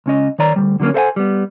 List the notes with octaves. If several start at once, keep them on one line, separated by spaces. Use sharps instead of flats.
C#2 C#4 D#5
D#3 C#5 D5 A#5
D2 B2 G3
D3 F#3 A3 A#3 C#4
A4 C5 D#5 F5 F#5 G#5
G3 B3